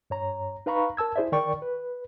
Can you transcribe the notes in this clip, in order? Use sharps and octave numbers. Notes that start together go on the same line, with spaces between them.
G2 C#5 A#5
D#4 B4 F5 A#5 B5 C#6
A#4 A5 E6 G#6
E4 G#4 C5 D5 E5
D#3 A#4 D5 G5 C#6
B4